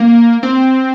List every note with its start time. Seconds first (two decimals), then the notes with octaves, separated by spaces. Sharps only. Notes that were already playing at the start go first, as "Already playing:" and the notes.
Already playing: A#3
0.43 C4